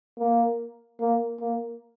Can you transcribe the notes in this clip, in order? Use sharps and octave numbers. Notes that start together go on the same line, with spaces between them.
A#3
A#3
A#3